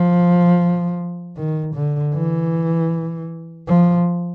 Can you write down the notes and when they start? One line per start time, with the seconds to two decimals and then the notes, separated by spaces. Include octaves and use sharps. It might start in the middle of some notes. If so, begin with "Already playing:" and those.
Already playing: F3
1.37 D#3
1.75 D3
2.14 E3
3.68 F3